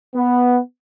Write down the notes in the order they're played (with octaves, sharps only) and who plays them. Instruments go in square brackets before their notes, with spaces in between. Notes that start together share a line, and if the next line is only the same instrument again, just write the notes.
[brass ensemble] B3